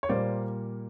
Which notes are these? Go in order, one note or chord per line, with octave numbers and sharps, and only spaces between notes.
C#5
A#2 G3 A#3 C5 D5